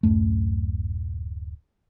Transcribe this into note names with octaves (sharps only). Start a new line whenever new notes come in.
D1 B1 F#2 A3